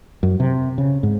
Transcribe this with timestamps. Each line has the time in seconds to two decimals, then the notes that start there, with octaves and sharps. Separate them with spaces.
0.23 F#2
0.40 C3
0.78 C#3
1.03 G#2